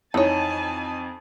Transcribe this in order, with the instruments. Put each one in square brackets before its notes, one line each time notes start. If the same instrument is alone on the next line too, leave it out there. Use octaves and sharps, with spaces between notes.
[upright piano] F2 D#4 [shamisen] E3 C#5 [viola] G#5 A5